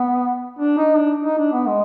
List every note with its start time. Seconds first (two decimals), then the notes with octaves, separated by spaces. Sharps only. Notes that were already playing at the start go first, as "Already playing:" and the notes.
Already playing: B3
0.59 D4
0.78 D#4
0.97 D4
1.25 D#4
1.39 D4
1.53 B3
1.67 G#3